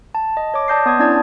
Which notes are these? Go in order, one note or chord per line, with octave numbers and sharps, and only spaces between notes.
A5
D#5
C#5 D6
D5 A5 D#6 G6 A#6 C7
B3 D#6 G#6
C#4 D4 E4 D5 G#6